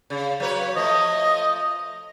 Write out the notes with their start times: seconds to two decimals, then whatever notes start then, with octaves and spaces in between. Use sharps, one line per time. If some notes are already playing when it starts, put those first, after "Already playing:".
0.10 C#3
0.40 F#3 B4 C#5
0.76 F3 A3 D#5